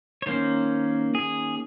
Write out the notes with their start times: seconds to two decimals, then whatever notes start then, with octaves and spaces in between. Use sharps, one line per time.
0.22 C#5
0.27 D#3 A#3 C#4 C5
1.15 G#4